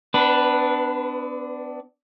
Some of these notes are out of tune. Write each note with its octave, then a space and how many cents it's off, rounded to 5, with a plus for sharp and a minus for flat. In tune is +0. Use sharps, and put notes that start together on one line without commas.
B3 +40 D4 +0 B4 +0